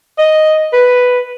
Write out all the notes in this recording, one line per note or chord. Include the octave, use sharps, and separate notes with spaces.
D#5
B4